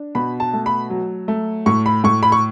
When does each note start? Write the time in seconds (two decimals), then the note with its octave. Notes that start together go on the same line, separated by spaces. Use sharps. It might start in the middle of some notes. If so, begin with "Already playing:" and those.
Already playing: D4
0.15 B2 B5
0.40 A5
0.53 A3
0.66 B5
0.90 F#3
1.28 A3
1.66 A2 C#6
1.86 B5
2.04 A2 C#6
2.23 B5
2.32 C#6